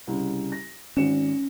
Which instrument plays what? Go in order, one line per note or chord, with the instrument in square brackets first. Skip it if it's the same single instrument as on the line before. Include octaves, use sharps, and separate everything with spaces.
[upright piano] C2 C#3
A#6
[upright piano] G#1 C#7 E7 [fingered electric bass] C#4